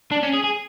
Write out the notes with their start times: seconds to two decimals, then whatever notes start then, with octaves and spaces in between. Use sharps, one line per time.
0.12 D4
0.23 C#4
0.34 G#4
0.44 G#4